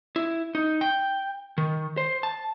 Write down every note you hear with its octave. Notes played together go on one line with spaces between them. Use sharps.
E4
D#4
G5
D#3
C5
A5